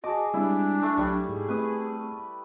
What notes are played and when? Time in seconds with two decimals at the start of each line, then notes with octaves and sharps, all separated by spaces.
0.04 F#4 G#4 D#5 A5 D6
0.34 G3 G#3 C4 D4 E4
0.82 A3
0.98 B1 F#3 G3 C#6
1.29 G#2 G#4
1.48 A3 C4 B4 D#6